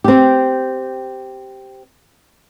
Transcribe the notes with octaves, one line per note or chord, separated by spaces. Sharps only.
C4 G4